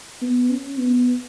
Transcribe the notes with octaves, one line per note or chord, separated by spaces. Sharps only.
B3
C#4
B3